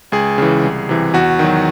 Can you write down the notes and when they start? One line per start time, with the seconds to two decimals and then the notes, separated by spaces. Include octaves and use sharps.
0.12 C#2 G#4
0.38 C#3 E3
0.63 C2
0.89 C3 E3
1.14 E2 F#4
1.39 D#3 F#3